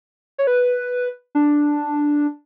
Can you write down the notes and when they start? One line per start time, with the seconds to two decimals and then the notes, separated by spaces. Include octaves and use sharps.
0.38 C#5
0.47 B4
1.35 D4